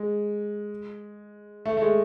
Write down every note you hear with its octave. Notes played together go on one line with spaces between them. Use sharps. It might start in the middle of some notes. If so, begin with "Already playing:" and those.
Already playing: G#3
A3
A3
G#3